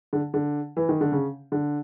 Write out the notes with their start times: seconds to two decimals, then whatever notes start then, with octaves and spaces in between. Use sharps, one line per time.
0.13 D3
0.34 D3
0.77 E3
0.89 D#3
1.01 D3
1.12 C#3
1.52 D3